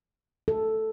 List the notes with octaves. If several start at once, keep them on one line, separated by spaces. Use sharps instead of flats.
A4